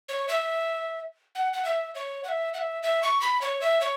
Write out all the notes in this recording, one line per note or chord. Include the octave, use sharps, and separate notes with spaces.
C#5
E5
F#5
F#5
E5
C#5
F#5
E5
F#5
E5
E5
C#6
B5
C#5
E5
C#5